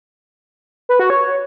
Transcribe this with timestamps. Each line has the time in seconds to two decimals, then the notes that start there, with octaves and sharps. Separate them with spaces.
0.89 B4
0.99 F#4
1.10 C#5